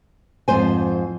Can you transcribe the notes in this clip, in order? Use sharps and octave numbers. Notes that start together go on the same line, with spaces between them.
F2 G#2 C5 G#5